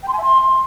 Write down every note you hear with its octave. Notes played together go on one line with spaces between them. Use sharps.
G5
C6
G#5
E5
C6